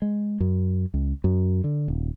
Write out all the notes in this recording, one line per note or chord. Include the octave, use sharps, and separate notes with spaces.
G#3
F#2
C#2
F#2
D3
D#1